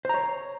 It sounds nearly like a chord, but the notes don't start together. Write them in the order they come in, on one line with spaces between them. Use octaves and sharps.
C5 A#5 C#5